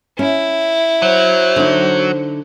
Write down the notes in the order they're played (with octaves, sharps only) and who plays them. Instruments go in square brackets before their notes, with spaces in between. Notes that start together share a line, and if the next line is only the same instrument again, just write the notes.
[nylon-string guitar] C#4 [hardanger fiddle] E4
[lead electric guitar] F#3 [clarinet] C5
[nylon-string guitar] D3 D#4